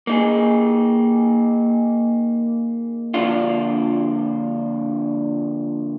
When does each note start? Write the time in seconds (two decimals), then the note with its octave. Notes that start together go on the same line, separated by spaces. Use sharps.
0.07 A#3 D#4 G#4
3.14 D3 F3 A#3 D4 F4